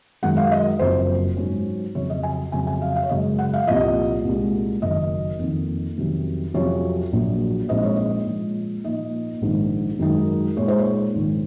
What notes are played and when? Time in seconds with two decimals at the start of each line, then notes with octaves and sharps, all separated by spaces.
0.23 F#2 D#3 G#3 F#5
0.37 F5
0.51 D#5
0.79 F#1 F#2 F3 C4 C5
1.37 G#2 F#3 C#4
1.95 F2 C#3 F#3 C#5
2.10 D#5
2.23 G#5
2.52 F2 C#3 F#3 G#5
2.67 G#5
2.82 F5
2.96 F5
3.03 C#5
3.09 F#2 C#3 G#3 D#5
3.39 F#5
3.53 F5
3.67 C2 A#2 F3 D#5
4.24 C2 A#2 G#3
4.82 F#1 F#2 D#3 D#5
5.39 F2 D#3 A#3 D#4
5.98 F2 C3 D#3 F#3 C#4
6.54 F2 C3 F#3 C#4 F4 C#5
7.12 A#1 A#2 F#3
7.69 A#1 A#2 G#3 C4 D#4 D#5
7.83 C#5
7.96 D#5
8.26 A#2 F3 G#3
8.84 A#2 F3 A#3 D#4 D#5
9.41 A#1 G#2 D#3
9.99 F#2 D#3 G#3 D#4
10.57 A#2 G#3 D#4 C#5
10.68 C5
10.78 C#5
11.15 A#1 G#2 D#3 G#3